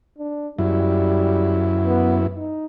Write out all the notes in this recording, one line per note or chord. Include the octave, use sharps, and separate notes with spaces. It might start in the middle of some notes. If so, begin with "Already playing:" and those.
D4
F#2 G3 E4
B3
D#4